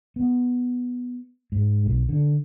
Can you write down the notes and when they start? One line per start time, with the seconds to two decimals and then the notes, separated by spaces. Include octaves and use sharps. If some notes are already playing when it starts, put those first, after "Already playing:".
0.16 B3
1.52 G#2
1.86 B1
2.09 D3